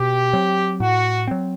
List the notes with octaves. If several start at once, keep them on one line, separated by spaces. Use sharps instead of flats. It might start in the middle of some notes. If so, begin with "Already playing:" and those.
Already playing: B2 G4
F#3 C4
A2 F#4
F#3 C4